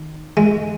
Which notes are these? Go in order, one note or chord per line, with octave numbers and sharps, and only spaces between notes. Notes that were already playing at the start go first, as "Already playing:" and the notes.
Already playing: D#3
G#3